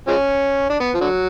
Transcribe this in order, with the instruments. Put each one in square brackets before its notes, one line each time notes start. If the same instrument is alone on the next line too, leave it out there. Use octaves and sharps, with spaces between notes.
[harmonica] F3 G#3 C#4
D4
B3
F3
D3 F#3